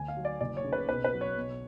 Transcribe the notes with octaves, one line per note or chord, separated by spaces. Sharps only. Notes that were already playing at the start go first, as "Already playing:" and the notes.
Already playing: D2 G#5
F5
F#3
D5
F#1 D5
C#5
C#3
B4
B1 B4
B4
F#3
C#5
B1